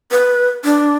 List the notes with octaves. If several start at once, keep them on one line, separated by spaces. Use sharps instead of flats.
B4
D4